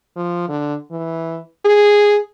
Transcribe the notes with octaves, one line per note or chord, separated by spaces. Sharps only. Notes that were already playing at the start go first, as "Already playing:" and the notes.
F3
D3
E3
G#4